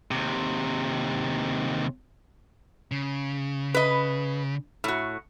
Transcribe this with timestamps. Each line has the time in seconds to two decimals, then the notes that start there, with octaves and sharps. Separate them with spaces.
0.11 D#2 C3
2.91 C#3
3.75 B4 D#5
4.84 A2 F#4